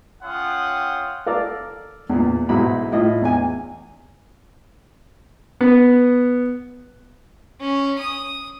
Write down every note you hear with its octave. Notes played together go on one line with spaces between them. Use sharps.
C#4 F4 F#5 G5 D#6
A4 A#4 D5 F5
E2 A#2
B1 G#2 E4 B5
A2 E4 F4 D#5
E2 G#5
B3
C#4
D#6